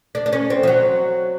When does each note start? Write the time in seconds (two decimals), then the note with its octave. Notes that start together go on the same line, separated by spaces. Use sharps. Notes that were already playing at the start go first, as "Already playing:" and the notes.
0.15 D4
0.26 D4
0.33 C#4
0.50 C4
0.63 F3
0.68 F#3